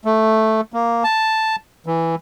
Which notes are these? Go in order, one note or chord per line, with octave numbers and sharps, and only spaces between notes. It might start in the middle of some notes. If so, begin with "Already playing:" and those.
A3
A#3
A5
E3